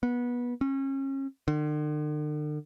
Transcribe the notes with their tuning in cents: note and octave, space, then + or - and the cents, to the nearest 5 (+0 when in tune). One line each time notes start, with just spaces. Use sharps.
B3 -20
C#4 -35
D3 +45